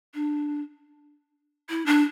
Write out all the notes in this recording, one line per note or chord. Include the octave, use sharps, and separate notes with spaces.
D4
E4
D4